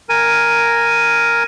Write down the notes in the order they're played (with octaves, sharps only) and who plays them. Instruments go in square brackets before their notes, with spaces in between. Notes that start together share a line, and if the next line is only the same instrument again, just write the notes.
[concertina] A#4 G#5